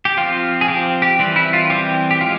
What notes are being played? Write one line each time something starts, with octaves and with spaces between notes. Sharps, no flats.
G4
F3 C4 F4
G#4
F3 C4 G4
G4
E3 G3 C4
E4
F4
E3 G3 C4 G4
G4
F3 G#3 F4